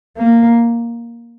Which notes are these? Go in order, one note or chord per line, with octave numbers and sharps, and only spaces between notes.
A#3